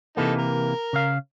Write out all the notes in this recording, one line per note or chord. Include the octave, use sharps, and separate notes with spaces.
C3 E3 A#3 D#4 A4
A#4
C#3 F5